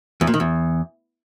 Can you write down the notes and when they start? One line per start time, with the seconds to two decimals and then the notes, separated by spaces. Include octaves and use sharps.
0.21 E2
0.27 A#2
0.34 D#3
0.40 E2